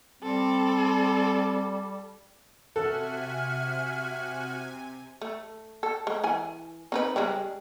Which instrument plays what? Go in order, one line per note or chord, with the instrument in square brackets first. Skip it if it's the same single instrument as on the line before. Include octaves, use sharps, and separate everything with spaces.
[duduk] G3 [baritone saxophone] C4 [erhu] A4
[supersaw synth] C3 G#5 [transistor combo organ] F#4 [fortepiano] A4 [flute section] E5 F6
[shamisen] A3
A4
G#3
E3 G#5
C4 D#4 B4
C#3 G3 G#3